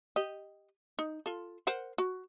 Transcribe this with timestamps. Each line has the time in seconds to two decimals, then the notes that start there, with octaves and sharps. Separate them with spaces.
0.16 G4 D#5
0.99 D#4
1.26 F4 A4
1.67 A#4 C5 F#5
1.98 F#4